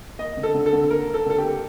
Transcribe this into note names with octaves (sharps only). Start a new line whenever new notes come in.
A#3 D#5
D3
A4
D3
A4
D3
A#3 A#4
A#3
A4
D3 A4
G4
A#3